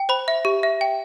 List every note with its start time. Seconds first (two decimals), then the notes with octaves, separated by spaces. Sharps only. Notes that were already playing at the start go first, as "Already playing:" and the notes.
Already playing: G5
0.09 C5 B5
0.28 E5
0.45 G4
0.63 E5
0.81 G5